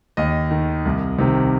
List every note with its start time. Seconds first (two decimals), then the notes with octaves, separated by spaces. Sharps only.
0.17 D#2 D#5
0.51 D#3
0.85 C2
1.19 C3 D#3